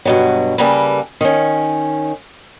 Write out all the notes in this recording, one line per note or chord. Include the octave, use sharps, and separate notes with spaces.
G2 B2 F#3
C#3 G3 A#3 A4 B4
D#3 C#4